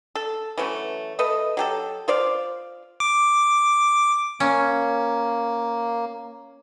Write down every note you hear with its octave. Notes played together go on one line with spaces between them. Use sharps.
A4
E3 F#3 A3 C#4
A3 A4 B4 D#5
F#3 G4 A4
F4 C5 D5 F5
D6
A#3 C#4